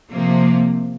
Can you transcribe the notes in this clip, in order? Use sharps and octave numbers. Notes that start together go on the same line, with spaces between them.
C3 F3 A#3